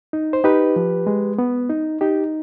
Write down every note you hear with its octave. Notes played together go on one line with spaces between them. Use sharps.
D#4
C5
D#4 G4 B4
F3
G#3
B3
D#4
D#4 G4